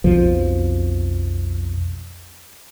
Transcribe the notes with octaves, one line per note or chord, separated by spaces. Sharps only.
B1 F2 B2 F3